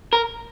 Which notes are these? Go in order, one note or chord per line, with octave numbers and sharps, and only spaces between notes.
A#4